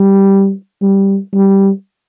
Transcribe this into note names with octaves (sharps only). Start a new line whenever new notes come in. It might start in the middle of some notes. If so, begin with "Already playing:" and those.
Already playing: G3
G3
G3